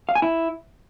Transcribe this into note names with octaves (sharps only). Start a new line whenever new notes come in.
F5
G#5
E4